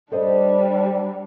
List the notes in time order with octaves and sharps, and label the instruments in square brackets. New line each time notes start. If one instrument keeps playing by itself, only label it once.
[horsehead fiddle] G3 D4 [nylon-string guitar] A4 C5 D#5